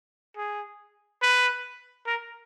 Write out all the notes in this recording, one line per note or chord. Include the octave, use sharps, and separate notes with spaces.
G#4
B4
A#4